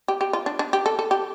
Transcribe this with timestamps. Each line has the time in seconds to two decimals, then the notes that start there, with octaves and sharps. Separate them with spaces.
0.08 G4
0.21 G4
0.33 F4
0.46 D4
0.59 D4
0.73 G4
0.86 A4
0.99 A4
1.11 G4